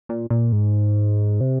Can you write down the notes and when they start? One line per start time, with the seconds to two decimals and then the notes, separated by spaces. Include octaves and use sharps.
0.09 A#2
0.30 A#2
0.52 G#2
1.41 C3